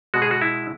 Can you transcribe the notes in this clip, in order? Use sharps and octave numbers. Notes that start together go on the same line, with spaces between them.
B2 G#3 F#4
G#4
F#4
E4